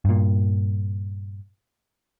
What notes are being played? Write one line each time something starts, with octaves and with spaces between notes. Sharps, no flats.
G2 A#2